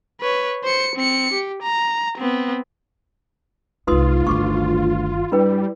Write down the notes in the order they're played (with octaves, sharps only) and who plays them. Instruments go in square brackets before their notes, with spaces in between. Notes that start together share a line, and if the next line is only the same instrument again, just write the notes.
[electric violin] B4 C#5
C5 C#7
C4 C#7
G4
A#5
B3 C4
[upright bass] C2 B3 [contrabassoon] G#2 [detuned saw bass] F4 [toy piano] B4 C6 D#6
[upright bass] G1 D#3 [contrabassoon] D2 [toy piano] C#6 D6
[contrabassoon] G2 [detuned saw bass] G3 [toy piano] E4 B4 G5